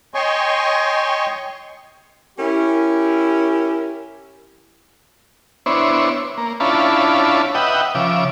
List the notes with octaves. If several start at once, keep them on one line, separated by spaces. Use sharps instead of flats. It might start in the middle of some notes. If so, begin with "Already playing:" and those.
C#5 D#5 G5 G#5 C6 C#6
C#4 E4 G4 A#4
B3 D4 E4 C5 C#5
A#3
C#4 D4 E4 F4 A5 B5
B4 D#5 E5 F#5 G5
C#3 F3 E5 D6